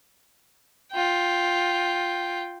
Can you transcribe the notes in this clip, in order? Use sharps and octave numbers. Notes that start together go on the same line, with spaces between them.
F4 G5